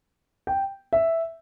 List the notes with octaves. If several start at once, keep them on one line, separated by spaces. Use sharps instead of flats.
G5
E5